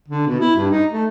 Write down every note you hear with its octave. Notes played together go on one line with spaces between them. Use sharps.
D3
B2
E4
G2
D#4
A3